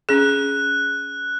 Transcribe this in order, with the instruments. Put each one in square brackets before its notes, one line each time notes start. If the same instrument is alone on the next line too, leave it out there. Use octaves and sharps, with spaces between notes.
[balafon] C#4 G#4 [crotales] F#6